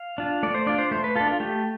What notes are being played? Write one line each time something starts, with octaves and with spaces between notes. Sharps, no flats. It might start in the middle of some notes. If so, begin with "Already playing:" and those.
Already playing: F5
D4 F4
A3 D5
C5
D4 F4 D5
C5
A3 C5
B4
D4 F4 A4
F4
A3 G4